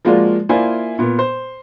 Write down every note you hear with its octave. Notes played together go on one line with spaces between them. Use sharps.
F3 G#3 A#3 F4 F#4 D5
A#3 E4 F4 C5 D5 G#5
A#2 B3
C5